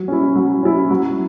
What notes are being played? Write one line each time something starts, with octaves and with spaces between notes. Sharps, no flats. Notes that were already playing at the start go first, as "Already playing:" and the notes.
Already playing: F#3
C#4 E4
F#3
C#4 E4
F#3